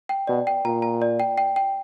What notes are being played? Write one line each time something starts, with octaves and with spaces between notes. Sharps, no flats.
G5
B2 D5
G5
A#2 A#5
A#5
D5
G5
G5
G5